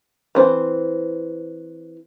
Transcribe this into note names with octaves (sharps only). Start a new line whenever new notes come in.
E3 C4 C5